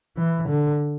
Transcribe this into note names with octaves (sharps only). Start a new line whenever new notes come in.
E3
D3